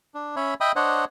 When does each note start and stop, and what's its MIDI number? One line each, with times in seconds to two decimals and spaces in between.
0.14 0.36 62
0.36 0.54 61
0.36 0.54 73
0.36 0.54 76
0.36 0.54 83
0.61 0.72 75
0.61 0.72 76
0.61 0.72 79
0.61 0.72 83
0.61 0.72 87
0.76 1.05 62
0.76 1.05 72
0.76 1.05 73
0.76 1.05 75
0.76 1.05 78